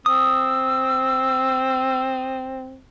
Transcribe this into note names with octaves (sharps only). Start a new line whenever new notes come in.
C4 D#6 E6